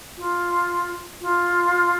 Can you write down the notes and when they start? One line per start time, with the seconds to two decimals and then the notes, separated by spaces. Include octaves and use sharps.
0.17 F4
1.21 F4